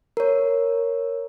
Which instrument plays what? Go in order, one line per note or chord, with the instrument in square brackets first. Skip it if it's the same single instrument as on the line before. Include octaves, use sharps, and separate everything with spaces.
[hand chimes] A#4 C#5